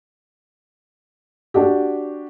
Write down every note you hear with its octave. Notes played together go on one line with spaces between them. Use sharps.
D4 F#4 G4